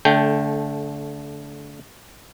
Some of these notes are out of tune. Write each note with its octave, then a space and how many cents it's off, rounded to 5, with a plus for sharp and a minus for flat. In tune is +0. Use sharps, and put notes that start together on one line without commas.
D3 -30 A3 -10 G5 +0